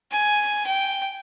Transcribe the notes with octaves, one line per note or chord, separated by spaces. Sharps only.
G#5
G5